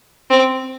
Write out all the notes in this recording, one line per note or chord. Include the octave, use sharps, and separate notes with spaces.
C4